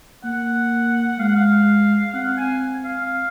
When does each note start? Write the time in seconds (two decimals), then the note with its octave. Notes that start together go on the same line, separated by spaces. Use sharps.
0.24 A#3 F#5
1.18 G#3 F5
1.28 F#5
1.36 F5
2.14 C4 F#5
2.37 G#5
2.85 F5